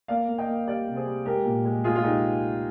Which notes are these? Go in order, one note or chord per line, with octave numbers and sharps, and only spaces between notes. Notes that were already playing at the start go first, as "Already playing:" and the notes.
A#3 D5 F5
A#3
D#5 G5
A#3
G3 D5 F5
C3
G#4 C5
G3
G#3 G4 A#4
A#2
G#3
G#3 F4 G#4
F4
G#3 D#4 G4